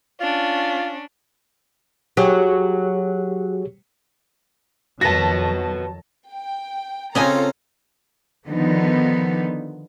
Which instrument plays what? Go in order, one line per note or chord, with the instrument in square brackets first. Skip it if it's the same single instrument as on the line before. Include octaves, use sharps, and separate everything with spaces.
[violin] C#4 D4 [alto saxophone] F4
[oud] F#3 [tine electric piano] G4 G#4 C#5
[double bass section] F2 D#3 F#3 [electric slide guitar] F#4 B4 [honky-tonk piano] A5 A#6
[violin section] G5
[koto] C#3 D#5 G#5 [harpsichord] C4 C#4 [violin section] F4 A4 A#5
[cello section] D3 D#3 F3 B3 D#4